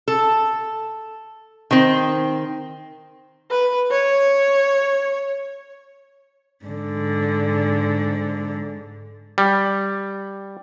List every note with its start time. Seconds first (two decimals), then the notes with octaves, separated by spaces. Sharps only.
0.08 A4
1.71 D#3 C4
3.51 B4
3.90 C#5
6.65 G#2 D3
9.38 G3